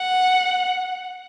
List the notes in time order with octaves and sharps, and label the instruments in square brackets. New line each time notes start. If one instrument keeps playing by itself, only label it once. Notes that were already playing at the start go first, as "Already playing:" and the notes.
Already playing: [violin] F#5